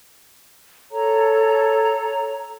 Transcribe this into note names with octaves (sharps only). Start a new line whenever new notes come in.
A4 C#5 A#5